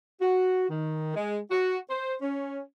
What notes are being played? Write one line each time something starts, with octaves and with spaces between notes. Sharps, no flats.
F#4
D#3
G#3
F#4
C5
C#4